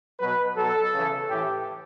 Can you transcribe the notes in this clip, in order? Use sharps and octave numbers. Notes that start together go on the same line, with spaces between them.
B2 F#3 B4
B2 F#3 A4
C#3 E3
A2 E3 G4